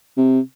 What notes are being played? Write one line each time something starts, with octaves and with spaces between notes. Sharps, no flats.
C3